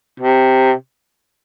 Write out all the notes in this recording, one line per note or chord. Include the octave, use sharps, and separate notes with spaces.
C3